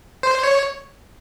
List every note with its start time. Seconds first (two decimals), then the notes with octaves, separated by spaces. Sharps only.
0.23 C5
0.43 C#5